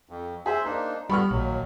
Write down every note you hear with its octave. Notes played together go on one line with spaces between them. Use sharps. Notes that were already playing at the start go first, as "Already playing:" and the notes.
F2
G#4 C5 E5
A#3 D4 D#4 C5
D3 G3 B3 B5 C#6 F6
A#1 D#2 F#3